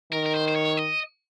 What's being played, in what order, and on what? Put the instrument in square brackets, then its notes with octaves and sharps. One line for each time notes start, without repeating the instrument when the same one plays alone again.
[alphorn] D#3 [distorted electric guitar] A#4
[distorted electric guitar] A#4
C5
C5
C#5
D#5